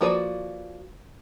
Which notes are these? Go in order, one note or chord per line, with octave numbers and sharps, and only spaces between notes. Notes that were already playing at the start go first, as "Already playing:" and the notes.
F3 A#3 F#4 B4 D5